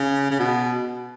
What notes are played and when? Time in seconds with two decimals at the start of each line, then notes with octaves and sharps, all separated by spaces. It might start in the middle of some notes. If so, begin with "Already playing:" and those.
Already playing: C#3
0.31 C#3
0.39 B2